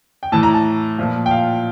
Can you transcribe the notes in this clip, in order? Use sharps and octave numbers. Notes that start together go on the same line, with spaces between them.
G5
A2 E3 A5
A#5
A5
A#2 F3
G5
F5